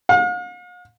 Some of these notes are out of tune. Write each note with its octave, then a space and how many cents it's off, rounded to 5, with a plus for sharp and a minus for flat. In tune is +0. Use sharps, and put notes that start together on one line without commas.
F5 +45